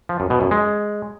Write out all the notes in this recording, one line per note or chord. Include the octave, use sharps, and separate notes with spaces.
F3
F#2
B2
F#2
G#3